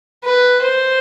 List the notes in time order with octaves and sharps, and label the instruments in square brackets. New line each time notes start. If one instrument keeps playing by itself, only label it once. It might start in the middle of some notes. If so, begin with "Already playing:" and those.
[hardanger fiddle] B4
C5